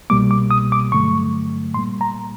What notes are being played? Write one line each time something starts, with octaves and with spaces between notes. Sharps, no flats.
C2 B2 G3 A#3 D6
D6
D#6
D6
G2 D3 F#3 A3 C#6
A#2 G3 A#3 C6
A#5